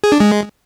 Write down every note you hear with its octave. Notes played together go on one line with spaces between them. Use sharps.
G#4
D4
G#3